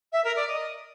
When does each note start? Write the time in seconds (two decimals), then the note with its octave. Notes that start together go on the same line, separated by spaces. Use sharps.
0.12 E5
0.24 A#4
0.36 D5
0.48 D#5